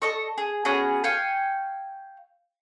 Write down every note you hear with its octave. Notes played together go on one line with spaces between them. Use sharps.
A4 D#5 C#6
G#4
B3 C#4 F#4 G#4
F5 G5 G#5 C#6